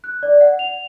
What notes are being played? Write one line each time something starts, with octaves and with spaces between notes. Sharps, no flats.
F#6
D5
F#5
F7